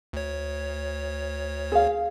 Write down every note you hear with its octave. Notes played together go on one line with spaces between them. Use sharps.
D2 C#5
G#4 F5